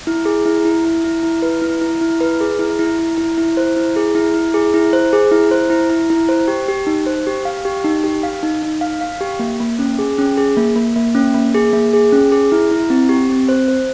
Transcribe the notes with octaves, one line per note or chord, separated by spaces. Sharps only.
E4
G#4
E4
E4
E4
E4
E4
B4
E4
E4
E4
B4
G#4
E4
E4
E4
E4
E4
C5
E4
G#4
E4
E4
G#4
E4
C5
G#4
E4
C5
E4
E4
E4
C5
G4
G4
D#4
C5
G4
F5
G4
D#4
G4
F5
D#4
D#4
F5
F5
G4
A#3
A#3
C#4
G#4
C#4
G#4
A#3
A#3
A#3
C#4
A#3
G#4
A#3
G#4
C#4
G#4
E4
E4
C4
G4
C4
C5
C5